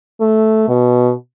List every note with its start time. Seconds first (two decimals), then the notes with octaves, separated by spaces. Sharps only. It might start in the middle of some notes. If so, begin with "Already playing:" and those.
0.20 A3
0.68 B2